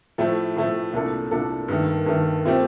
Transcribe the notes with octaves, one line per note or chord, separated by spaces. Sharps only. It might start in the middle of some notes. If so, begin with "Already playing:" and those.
A2 F3 A3
A2 F3 A3
C2 A#2 A3 D4 A4
C2 A#2 A3 D4 A4
G2 D#3 A3
G2 D#3 A3
A#2 A3 C4 G4